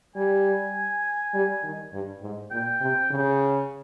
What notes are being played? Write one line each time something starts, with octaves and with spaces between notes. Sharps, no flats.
G3 G#5
G3
D#3
G2
G#2
A#2 G5
C3
C#3